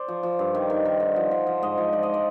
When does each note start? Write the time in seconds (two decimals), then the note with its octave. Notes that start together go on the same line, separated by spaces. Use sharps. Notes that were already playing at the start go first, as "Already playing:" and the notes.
Already playing: C5 D5
0.08 F3
0.23 F3
0.39 G2
0.55 D#3
0.70 D#3
0.85 D#3
1.00 D3
1.16 F3
1.31 D3
1.47 F3
1.62 G#2 D#5
1.78 F3
1.93 F3 D5
2.03 D#5
2.14 D5